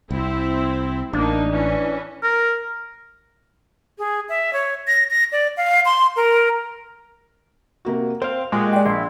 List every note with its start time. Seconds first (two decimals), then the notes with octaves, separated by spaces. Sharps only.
0.11 C2 C4 E4
1.13 A1 A#3 D4 D#4
1.50 E3 C#4
2.23 A#4
3.99 G#4
4.29 E5
4.53 C#5
4.87 A#6
5.11 A#6
5.32 D5
5.57 F5
5.85 C6
6.16 A#4
7.85 C3 A#3 F#4
8.22 C4 C5 F5
8.52 A#2 G#3 F#4 G4 F5
8.73 D5 G5
8.86 A#1 E4 C6